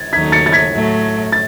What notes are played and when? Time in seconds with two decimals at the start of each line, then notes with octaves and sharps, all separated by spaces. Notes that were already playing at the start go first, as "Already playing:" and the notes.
Already playing: G#6 A6
0.12 D#2 D#3 F#3 A3 D#4 G#6 B6
0.32 A6 C#7
0.46 A6
0.52 G#6 B6
0.73 A2 F#3 A3
1.32 A6